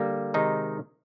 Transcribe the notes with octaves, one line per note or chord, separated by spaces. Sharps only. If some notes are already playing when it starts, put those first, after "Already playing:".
Already playing: D3 G3 A#3
C3 D#3 G#3 D#4